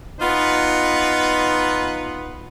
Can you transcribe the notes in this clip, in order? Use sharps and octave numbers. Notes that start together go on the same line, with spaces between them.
B3 D#4 F4 B4